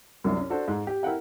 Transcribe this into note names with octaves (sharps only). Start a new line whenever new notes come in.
C2 F#2 F#3 D4
C#4
D4 F#4 A4 C5
G#2
G4
E4 A#4 F#5 G5